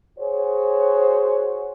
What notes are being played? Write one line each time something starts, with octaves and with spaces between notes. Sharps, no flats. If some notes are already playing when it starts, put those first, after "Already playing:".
F#4 G#4 C5 C#5